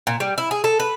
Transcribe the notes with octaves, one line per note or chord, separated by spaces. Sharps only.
A#2
G3
E4
G#4
A4
B4